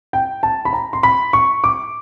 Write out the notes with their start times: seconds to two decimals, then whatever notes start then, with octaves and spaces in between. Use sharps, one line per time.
0.13 G5
0.43 A5
0.65 B5
0.73 A#5
0.93 C6
1.03 B5
1.33 C#6
1.64 D6